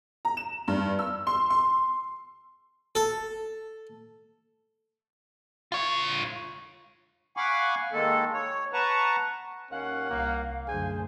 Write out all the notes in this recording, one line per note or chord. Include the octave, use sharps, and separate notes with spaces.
A#5
E7
G2
E6
C6
C6
A4
F4 C#5
F5 F#5 G#5 B5 C#6 D6
D#3 G#3 A#3 A4
C#5
B4 F#5 A5 A#5 C#6
D#2 C#4 F5 F#5
C2 A#3
F#2 D3 A3 G#4 C5 G#5